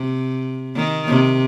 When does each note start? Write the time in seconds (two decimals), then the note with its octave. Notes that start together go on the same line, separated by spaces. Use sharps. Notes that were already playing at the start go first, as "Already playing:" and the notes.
Already playing: C3
0.76 D#3
1.07 C3